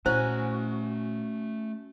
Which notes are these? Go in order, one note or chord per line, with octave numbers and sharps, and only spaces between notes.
A#2 A3 C#4 E4 F#4 C5 G#5